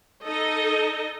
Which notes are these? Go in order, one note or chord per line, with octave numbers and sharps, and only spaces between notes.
D#4 A4 D#5